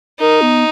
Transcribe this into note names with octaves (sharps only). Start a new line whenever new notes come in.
D#4 A#4
B3